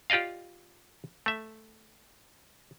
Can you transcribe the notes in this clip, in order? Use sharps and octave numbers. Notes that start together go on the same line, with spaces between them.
F4 G4 D5 D#5 F5
A3 E5